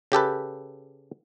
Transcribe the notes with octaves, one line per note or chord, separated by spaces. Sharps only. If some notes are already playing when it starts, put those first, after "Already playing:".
C#3 G4 A4 B4